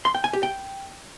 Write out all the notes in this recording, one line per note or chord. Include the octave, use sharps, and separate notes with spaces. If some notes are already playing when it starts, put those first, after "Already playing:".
C6
G5
G#5
G4
G5